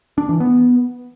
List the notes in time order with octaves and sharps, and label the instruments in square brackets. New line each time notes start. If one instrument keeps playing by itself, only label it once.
[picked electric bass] D4
E3
B3